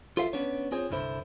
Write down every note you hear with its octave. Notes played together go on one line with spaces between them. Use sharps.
F4 A4 C5 E5 F5
B3 C#4 D4 C#5
C4 F4 G#4 C5 C#5
C2 G2 D3 E4 C5